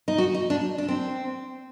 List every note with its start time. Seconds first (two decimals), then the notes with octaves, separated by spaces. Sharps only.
0.08 D#4
0.18 F#4
0.34 D#4
0.50 D4
0.78 D4
0.88 C4